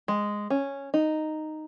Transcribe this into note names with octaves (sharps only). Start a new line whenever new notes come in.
G#3
C#4
D#4